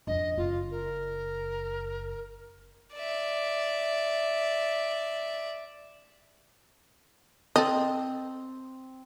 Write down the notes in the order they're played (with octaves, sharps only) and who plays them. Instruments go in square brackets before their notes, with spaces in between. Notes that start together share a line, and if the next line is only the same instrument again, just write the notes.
[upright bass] F2 D4 [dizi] D#5
[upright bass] F#1 [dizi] F4
[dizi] A#4
[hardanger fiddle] D5 E5
[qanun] C4 [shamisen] A4 D#5